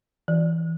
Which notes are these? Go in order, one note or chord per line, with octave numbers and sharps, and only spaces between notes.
E3